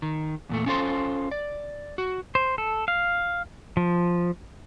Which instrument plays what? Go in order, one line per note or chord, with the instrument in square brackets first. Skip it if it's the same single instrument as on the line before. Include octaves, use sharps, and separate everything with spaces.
[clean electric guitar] D#3
E2 A#2 A3
C#4 D4 F4 A4 C5 C6
D5
F#4
[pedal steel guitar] C5
A4
F5
F3